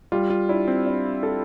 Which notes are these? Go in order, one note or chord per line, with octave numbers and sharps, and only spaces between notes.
G3 F4
F4
D4 E4
C4
D4
A4